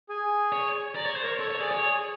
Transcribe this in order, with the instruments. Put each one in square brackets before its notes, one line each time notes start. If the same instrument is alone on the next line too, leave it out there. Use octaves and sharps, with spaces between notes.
[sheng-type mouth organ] G#4 G#5
[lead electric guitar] C#5
[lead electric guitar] D5 [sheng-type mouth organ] A#5
[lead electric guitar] C#5
C5
[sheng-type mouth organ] A#4 A#5 [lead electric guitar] C#5
[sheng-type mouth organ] A4 A5 [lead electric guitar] C#5
[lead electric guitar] C#5
[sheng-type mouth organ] G#4 G#5 [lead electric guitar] D5
[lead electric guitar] C#5
[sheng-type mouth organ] G#4 G#5
G#5